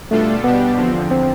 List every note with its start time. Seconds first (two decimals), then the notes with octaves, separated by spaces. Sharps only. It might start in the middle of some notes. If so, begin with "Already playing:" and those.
0.11 B2 G3 A3 D4 F4 A4
0.44 B2 G3 B3 D4 G4
0.77 E2 D3 F3 C4
1.11 C4